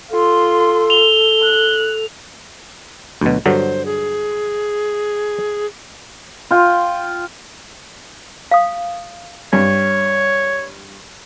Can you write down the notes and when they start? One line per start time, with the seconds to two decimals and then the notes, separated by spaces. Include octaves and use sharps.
0.11 F4 A4 C6
0.90 F7 G7
1.43 F#6
3.21 D2 B2 F#3
3.46 G2 D3 F#3 C5
3.86 G#4
6.51 F4 G5
8.51 F5 D#6
9.53 G2 C#5